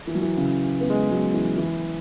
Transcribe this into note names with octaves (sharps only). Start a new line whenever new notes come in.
E3
F#3
E3
C#3
B3
G#3
F#3
E3
E3